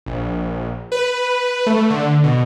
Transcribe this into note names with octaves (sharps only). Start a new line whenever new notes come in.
A#1
B4
A3
D3
B2